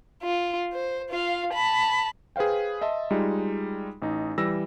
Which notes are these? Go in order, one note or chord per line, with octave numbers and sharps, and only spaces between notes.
F4
C5
F4 F5
A5 B5
G#4 B4 C5 F5 G5
D#5 E5 A5 C6
G3 G#3 D#4 F4
A1 D#4
E3 G3 E6 A#6